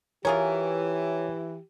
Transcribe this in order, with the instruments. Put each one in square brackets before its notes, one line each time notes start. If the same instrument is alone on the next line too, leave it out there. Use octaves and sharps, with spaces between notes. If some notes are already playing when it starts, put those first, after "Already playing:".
[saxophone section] E3 [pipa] F4 G#4 A#4 [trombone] G4 [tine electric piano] C#5